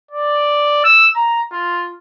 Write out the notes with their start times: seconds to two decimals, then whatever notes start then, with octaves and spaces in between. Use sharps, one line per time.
0.11 D5
0.84 E6
1.16 A#5
1.52 F4